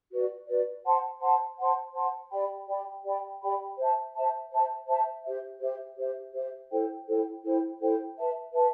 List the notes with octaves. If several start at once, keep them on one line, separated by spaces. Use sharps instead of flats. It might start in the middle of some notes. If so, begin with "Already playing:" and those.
F#4 B4 D5
F#4 B4 D5
C5 F#5 A5 C6
C5 F#5 A5 C6
C5 F#5 A5 C6
C5 F#5 A5 C6
G4 D5 G5 B5
G4 D5 G5 B5
G4 D5 G5 B5
G4 D5 G5 B5
C5 E5 A5
C5 E5 A5
C5 E5 A5
C5 E5 A5
G4 C5 E5
G4 C5 E5
G4 C5 E5
G4 C5 E5
E4 A4 C5 G5
E4 A4 C5 G5
E4 A4 C5 G5
E4 A4 C5 G5
B4 E5 A5
B4 E5 A5